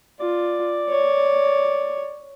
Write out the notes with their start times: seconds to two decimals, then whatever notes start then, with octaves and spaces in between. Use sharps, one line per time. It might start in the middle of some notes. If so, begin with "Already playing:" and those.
0.20 F4 D5
0.89 C#5